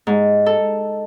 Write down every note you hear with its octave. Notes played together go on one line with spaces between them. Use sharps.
G#2
A4